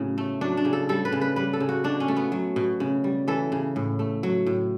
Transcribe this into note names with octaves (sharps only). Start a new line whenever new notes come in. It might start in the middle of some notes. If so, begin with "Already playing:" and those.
Already playing: A2 C#3 F#3 B3
A3
F#3 D4
D4
C#3
A4
G3 A4
B4
C#3
B4
G3 B4
A4
C#3
F#4
B2 D4
C#4
A3
B3
F#3
B2
C#3
G3
E3 A4
C#3
A2
A3
F#3
A2